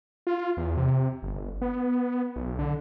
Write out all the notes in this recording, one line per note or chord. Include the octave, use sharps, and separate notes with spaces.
F4
E2
C3
G1
B3
B1
D3